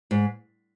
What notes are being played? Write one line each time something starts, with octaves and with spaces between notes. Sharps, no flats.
G#2